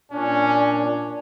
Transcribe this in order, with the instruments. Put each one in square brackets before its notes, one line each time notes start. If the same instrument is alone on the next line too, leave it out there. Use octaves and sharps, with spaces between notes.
[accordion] A#2 D4 [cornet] C#4